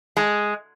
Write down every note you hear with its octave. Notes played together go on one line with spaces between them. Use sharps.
G#3